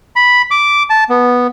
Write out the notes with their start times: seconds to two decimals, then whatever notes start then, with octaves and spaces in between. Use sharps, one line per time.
0.16 B5
0.51 D6
0.90 A5
1.09 B3